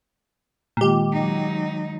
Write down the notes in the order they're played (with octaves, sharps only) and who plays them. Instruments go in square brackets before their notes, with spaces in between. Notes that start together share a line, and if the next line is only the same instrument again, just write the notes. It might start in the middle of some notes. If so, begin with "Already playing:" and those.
[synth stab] A#2 G4 [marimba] D#3 G#3
[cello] F#3 D#4